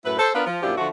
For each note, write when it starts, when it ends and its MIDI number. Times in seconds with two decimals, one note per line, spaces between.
0.05 0.16 42
0.05 0.16 45
0.05 0.16 64
0.05 0.16 71
0.18 0.30 69
0.18 0.30 72
0.34 0.44 59
0.34 0.44 62
0.34 0.44 65
0.34 0.44 70
0.34 0.44 71
0.47 0.63 53
0.63 0.75 42
0.63 0.75 46
0.63 0.75 53
0.63 0.75 62
0.63 0.75 64
0.63 0.75 67
0.78 0.88 50
0.78 0.88 53
0.78 0.88 57
0.78 0.88 65
0.78 0.88 66